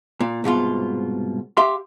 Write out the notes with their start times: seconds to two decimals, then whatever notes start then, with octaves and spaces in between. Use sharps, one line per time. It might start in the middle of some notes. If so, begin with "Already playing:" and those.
0.21 A#2
0.44 C2 G#2 B2 F4
1.57 G4 E5 F5 C6